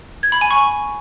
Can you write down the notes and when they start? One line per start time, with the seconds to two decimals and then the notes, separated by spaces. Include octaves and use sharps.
0.23 G#6
0.32 B5
0.41 G#5
0.51 C#6